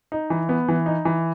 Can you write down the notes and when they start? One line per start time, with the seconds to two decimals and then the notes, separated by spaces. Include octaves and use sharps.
0.12 D#4
0.30 E3
0.49 B3
0.68 E3
0.86 D#4
1.05 E3